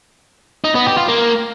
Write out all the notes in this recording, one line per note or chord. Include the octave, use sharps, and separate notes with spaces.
D#4
B3
G4
F4
A#3